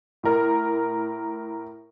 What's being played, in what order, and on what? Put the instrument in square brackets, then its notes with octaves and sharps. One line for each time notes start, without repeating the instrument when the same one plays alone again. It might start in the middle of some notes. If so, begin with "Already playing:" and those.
[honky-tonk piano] A2 A#4